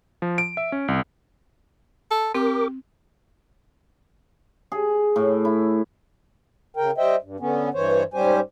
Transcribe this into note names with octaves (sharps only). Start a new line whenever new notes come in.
F3
D7
E5
C#4
C2
A4
C4 G4 A#4 D6
G#4
A2
E4
C#3 A#4 G5
G3 C5 D#5 E5 G5
G2
D3 B3 C#4
G2 E3 C5 C#5
G#2 G3 C#4 G4 C5 G#5